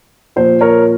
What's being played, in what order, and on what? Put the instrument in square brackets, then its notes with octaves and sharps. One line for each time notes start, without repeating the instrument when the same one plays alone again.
[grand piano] A#2 F3 C5
A#4 C#5